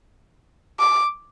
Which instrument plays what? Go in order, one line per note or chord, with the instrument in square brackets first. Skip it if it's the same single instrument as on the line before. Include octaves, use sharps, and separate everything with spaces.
[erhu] D6